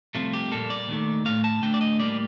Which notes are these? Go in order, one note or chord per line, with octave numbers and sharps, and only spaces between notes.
C2 C3 F3 A3 F4
G4
A#2 G3 A#3 A4
D5
D#2 D#3 A3
A2 A3 F5
A5
D2 D3 A3 G5
D5
D#5
A2 G3 A#3 D5